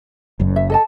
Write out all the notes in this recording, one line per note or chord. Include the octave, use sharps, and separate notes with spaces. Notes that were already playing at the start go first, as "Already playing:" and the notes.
F#1 F#2
E5
A4 D#5 A5